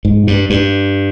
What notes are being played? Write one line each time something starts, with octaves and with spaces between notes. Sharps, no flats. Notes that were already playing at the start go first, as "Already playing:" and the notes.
G#2
G2
G2